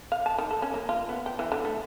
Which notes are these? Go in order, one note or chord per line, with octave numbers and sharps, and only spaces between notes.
F5
A5
D#3
A4
C#4
A#3
F4
B3
G5
E3
D3
A3